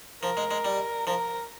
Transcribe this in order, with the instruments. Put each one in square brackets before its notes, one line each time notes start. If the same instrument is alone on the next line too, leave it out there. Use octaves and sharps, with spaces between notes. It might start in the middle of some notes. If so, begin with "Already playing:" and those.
[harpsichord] F3 [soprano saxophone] A#4
[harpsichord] G#3
G#3
G3
[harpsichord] F3 [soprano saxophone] A#4